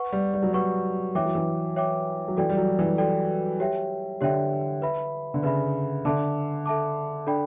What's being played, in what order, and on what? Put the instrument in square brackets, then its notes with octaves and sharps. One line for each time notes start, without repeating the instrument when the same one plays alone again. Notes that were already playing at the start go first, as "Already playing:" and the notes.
Already playing: [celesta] B4 F#5 C#6
[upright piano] G3
G3
F#3
[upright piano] G3 [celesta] B4 F#5 C#6
[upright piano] E3 [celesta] C#5 E5 G5 D6
[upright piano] F#3
E3
[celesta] C#5 E5 G5 D6
[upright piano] F#3
[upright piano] E3 [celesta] F#4 A4 D5 G5
[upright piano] G3
F#3
E3
[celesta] F#4 A4 D5 G5
G4 C#5 E5 G5
[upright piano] D3 [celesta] G4 C#5 E5 G5
[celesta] B4 E5 B5
[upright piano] D3
[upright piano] C#3 [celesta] B4 E5 B5
[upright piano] D3 [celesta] A4 E5 A5 D6
[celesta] A4 E5 A5 D6
D4 A4 D5 G5 B5